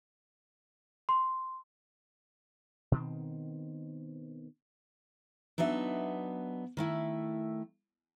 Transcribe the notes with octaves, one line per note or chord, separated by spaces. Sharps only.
C6
B2 D#3 C4
F#3 B3 D4 D#4 E5
D#3 A3 E4